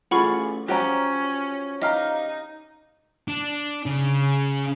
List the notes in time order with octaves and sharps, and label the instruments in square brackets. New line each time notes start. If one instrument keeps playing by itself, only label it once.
[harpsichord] A1 A3 [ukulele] F4 G#4 [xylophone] F#5 B5 C#6
[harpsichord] F3 F#3 F#4 [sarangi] C#4 [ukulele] G4 G5 A#5
[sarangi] D#4 [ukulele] G4 F5 A#5 [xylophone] D#5 F6
[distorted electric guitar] D4
C#3